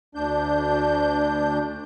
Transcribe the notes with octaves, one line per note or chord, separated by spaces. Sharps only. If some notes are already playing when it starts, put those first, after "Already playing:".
D2 D4 G6